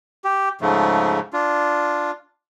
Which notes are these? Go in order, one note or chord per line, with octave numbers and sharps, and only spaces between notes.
G4
G#2 C#3 F3 A3
D4 F4